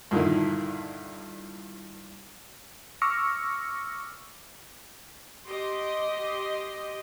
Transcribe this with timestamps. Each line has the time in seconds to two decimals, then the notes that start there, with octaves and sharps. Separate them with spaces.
0.11 G2 A#2 D3 D#3 E4
3.02 C#6 D6 E6 F6 A#6 C#7
5.46 G4 D#5 C6